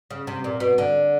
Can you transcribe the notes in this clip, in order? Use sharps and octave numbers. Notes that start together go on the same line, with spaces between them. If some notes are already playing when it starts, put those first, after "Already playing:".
C#3
C3
A#2
B2
D3